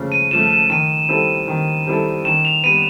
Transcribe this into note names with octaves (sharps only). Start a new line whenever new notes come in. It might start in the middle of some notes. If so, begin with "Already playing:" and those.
Already playing: C#3 F3 A3
D#7
F3 A3 E7
E7
D#3 D#7
G3 C4 E4 A4
D#3
G3 C4 E4 A4
D#3 E7
F7
G3 B3 D#7